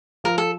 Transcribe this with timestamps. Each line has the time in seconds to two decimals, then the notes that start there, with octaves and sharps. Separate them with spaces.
0.24 F3 A#4
0.38 A4